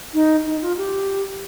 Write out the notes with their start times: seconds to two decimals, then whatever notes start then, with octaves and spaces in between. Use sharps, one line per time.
0.14 D#4
0.46 D#4
0.62 F4
0.78 G4